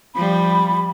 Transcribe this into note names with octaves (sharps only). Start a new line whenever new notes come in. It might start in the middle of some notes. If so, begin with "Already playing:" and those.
F3 G3 B5